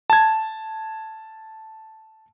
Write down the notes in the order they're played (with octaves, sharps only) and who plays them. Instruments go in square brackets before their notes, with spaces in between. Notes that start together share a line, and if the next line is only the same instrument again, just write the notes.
[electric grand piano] A5 G#6